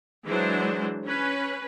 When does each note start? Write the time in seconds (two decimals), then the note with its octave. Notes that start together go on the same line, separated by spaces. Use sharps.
0.25 E3 F#3 G#3 D4 C5
1.05 C#4 B4